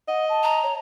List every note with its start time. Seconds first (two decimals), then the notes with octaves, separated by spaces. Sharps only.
0.08 D#5 F#5
0.29 A5
0.43 A#5
0.63 C#5